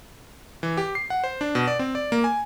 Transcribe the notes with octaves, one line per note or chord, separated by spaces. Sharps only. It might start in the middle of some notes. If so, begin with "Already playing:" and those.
E3
G4
C7
F#5
C5
D4
B2
D5
C4
D5
A#3
G#5